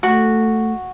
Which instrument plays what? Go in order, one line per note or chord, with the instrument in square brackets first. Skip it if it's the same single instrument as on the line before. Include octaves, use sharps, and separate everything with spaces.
[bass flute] A3 [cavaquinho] F#4